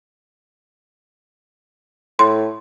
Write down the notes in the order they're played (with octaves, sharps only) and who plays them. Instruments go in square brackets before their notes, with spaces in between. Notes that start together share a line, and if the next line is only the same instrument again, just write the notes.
[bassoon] A2 [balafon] C6